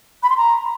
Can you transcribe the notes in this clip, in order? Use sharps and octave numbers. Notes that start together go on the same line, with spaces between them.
B5
C6
A#5